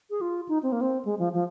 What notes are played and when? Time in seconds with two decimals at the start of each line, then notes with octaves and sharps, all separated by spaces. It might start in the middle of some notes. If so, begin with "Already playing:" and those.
0.10 G#4
0.21 F4
0.49 D#4
0.63 C4
0.72 A#3
0.81 C4
1.05 G#3
1.19 F3
1.34 F3